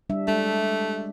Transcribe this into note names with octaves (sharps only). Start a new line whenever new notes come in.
G3 D4 E5
G#3 A3 D4